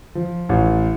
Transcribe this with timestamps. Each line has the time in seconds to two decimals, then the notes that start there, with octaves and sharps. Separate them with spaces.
0.15 F3
0.49 A1